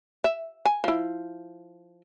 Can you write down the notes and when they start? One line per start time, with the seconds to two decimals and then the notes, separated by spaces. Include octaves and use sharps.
0.24 E5
0.65 G#5
0.84 F3 E4